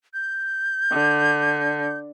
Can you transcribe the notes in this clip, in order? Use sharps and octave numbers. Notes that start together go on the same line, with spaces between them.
G6
D3